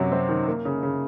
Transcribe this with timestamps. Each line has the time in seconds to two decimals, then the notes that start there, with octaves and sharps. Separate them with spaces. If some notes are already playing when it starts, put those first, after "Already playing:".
Already playing: F#2 C3 F#3
0.12 C4
0.29 D#3
0.47 A#3
0.65 C#3
0.83 C#3